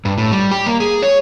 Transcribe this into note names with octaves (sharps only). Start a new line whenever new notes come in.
G2
A2
G3
G4
A#3
G#4
C#5